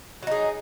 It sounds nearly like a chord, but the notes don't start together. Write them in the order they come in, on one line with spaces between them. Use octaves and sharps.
F#3 D#4 G#4